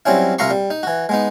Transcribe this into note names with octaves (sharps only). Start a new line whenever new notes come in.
F#3 G3 C4 C#4 E4
C2 F4 E5 A#5 C6 C#6
G3
D#4
E3 F#4
G#3 B3 D#4